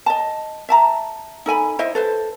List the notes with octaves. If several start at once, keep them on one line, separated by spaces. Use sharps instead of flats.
D#5 A5
E5 A5 A#5
D#4 A4 G#5 B5
E4 C5 D#5 E5
A4 B4 C5